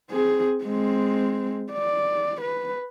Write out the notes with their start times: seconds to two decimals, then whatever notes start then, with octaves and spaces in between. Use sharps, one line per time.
0.11 C4 G#4
0.64 G#3 C4
1.72 D5
2.41 B4